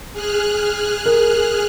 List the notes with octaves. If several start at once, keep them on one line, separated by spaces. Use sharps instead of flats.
G#4 F6 F#6
A#4